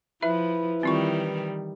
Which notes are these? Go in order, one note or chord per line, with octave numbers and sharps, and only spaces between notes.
F3 E4 B4 E5
D#3 E3 G3 C4 F4 C#6